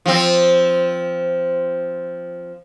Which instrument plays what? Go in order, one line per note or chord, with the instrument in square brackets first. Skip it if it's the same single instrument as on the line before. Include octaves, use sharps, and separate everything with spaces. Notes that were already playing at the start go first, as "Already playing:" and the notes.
[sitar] F3 C4